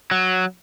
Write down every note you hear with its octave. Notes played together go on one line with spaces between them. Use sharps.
F#3